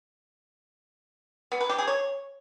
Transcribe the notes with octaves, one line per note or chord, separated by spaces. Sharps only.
B3
B4
G4
G#4
C#5